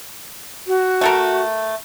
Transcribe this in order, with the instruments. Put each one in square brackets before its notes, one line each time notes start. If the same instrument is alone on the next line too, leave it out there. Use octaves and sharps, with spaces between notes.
[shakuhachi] F#4
[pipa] A3 A4 A#4